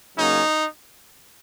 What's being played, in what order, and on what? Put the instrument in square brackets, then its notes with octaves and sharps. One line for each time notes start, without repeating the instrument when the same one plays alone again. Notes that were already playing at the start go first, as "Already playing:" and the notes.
[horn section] C#3 F#3 A#3 C#4 D#4